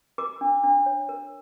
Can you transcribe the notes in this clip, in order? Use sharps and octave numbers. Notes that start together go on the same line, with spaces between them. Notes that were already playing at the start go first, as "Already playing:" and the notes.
A#4 D6
D4
D4
C#5
A#4